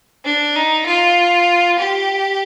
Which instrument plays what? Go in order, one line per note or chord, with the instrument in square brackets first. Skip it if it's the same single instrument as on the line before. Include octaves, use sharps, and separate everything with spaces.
[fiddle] D4
D#4
F4
G4